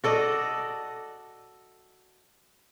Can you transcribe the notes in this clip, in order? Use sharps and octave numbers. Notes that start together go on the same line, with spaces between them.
F#4 A4 D5 D#5